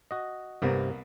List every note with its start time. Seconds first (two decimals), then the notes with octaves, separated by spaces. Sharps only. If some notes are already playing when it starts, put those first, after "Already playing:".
0.11 F#4 D#5
0.62 C2 G2 C3 A#3 B3